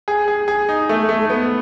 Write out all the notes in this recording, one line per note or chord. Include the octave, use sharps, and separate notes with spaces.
G#4
G#4
G#4
D#4
A3
A3
B3